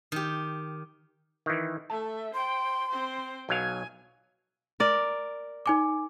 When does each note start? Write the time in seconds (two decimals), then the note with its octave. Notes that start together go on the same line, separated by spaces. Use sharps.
0.12 D#3 G4
1.46 D#3 E3
1.90 A3 E5 A5
2.34 C5 G5 C6
2.89 C4 C5
3.49 B1 F#3 F5 G#5
4.80 A#4 D5
5.66 D#4 G#5 D6